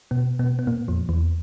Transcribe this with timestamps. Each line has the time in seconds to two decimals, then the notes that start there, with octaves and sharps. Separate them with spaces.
0.11 B2 B3
0.39 B2 B3
0.59 B3
0.67 A#2 A#3
0.88 F2 F3
1.09 E2 E3